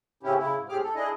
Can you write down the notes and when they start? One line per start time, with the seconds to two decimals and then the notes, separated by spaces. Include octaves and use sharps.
0.23 A2 C#3 C4 C#4 E4 G4
0.38 C#3 E4
0.56 G#2
0.69 A2 C4 G4 G#4 D6 F6
0.83 A4
0.95 D4 E4 G#4 D#5